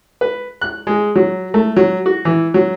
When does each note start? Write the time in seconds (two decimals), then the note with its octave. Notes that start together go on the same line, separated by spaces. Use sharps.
0.21 B4
0.61 F#6
0.87 G#3
1.15 F#3
1.54 A3
1.76 F#3
2.06 F#4
2.25 E3
2.54 F#3